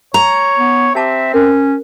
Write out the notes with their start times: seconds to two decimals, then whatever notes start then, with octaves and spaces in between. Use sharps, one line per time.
0.14 C#5 A#5
0.57 B3
0.95 C4 G4 E5 A5 D6
1.34 C#4 A#4 C5